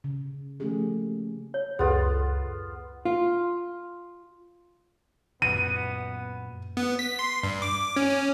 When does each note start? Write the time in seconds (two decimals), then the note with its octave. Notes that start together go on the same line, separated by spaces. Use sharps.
0.04 C#3
0.60 F3 A3 A#3 C#4 G4 G#4
1.54 C#5
1.79 C#2 F#2 A2 B3 F4 G#4 A4
3.05 F4
5.42 F#2 A#2 B3 D#7
6.77 B3
6.99 B6
7.19 C6
7.43 G2
7.62 D6
7.96 C#4
8.10 C#4